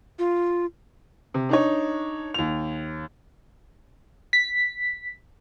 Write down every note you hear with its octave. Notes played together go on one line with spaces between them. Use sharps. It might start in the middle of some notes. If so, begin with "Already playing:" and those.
F4
C3
D4 D#4 C#5
D#2 F7
B6